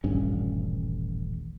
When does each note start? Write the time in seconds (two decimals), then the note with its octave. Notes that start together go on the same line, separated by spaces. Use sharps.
0.04 D#1 A1 G2 C#4